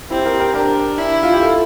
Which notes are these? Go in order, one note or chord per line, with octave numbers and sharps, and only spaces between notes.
C4 E4 G4
G4 A#4
G4 A#4
D4 G4 A#4
E4
F4
G4
F4 A4